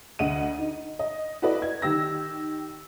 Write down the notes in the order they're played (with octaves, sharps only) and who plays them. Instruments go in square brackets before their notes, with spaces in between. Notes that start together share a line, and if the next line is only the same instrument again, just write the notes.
[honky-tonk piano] D2 D#5 F#5 D#7
D#4
D#5
E4 F#4 A4 B4 D5 D#5
G#6
D#3 G4 E6 A#6